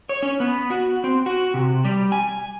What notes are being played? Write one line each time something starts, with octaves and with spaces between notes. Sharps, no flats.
C#5
C#4
B3
F#4
C4
F#4
C3
G3
G#5